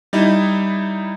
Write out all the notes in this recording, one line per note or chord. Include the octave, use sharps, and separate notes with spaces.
G3 D#4 E4